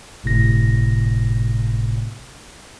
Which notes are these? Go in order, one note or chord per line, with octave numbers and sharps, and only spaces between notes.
G1 A2 C3 A#6